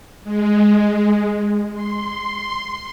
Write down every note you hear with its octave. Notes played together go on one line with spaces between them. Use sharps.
G#3
C6